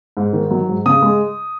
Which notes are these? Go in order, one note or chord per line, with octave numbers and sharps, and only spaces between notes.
G#2
D#3
F#3
G#2
C#3 D#6
G#3